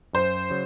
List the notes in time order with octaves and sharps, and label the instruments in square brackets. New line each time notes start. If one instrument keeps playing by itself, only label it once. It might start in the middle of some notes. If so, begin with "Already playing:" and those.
[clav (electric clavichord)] F#2 [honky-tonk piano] C5
[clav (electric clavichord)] C#3 F#3